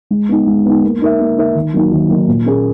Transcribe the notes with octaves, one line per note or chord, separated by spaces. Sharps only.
G#3
B3 D#4
G#3
B3 D#4
A#3
D#4 A#4 E5
A#3
D#4 A#4 E5
D#3
F#3 A#3 D#4
D#3
F#3 A#3 D#4
A#2
A#3 C#4 G#4